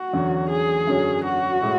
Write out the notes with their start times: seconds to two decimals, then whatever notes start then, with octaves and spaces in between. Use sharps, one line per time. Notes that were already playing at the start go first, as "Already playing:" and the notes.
Already playing: F#4
0.13 E2 D3 F#3 C#4
0.50 G#4
0.87 F#2 D3 F#3 C#4
1.25 F#4
1.62 A2 G#3